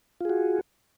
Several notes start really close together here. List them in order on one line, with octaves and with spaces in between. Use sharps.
F4 G#4 F#4